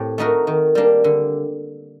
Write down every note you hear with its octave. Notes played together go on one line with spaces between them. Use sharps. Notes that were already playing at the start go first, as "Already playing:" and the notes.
Already playing: A2 C4 G4
A3 D#4 F#4 A#4
D#3
G3 A#3 D4
D3